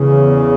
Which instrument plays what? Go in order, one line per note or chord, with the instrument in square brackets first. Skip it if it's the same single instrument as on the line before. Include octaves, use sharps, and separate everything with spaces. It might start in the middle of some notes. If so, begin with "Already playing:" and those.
Already playing: [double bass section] E2 C#3